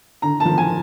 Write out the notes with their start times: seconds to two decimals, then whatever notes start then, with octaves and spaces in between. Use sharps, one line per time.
0.22 D3 A#5
0.40 A5
0.45 F3
0.58 G#5